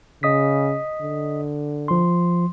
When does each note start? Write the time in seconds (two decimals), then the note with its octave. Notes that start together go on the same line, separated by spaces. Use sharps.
0.23 C#3 D#5 D#6 B6
1.01 D3
1.88 F3 C6